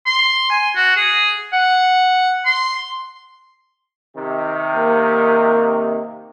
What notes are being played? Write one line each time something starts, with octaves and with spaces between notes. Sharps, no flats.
C6
G#5
F#4
G#4
F#5
C6
C3 D#3
A#3